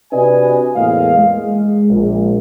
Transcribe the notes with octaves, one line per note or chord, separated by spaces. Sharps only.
C3 D4 F#4 B4 D#5 G#5
E2 A2 G#3 A#3 D#5 F5
G#3
A#1